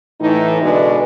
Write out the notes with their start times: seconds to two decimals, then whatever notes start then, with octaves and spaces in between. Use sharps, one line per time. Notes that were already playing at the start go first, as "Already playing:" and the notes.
0.21 A2 E3 D#4
0.62 B2 D3 G#3 D4 B4